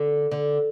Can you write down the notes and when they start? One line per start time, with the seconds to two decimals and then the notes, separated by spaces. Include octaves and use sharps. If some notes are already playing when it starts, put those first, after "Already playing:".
Already playing: D3
0.31 D3